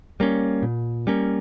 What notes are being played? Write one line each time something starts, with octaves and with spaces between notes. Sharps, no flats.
G3 A#3 C#4
A#2
G3 A#3 C#4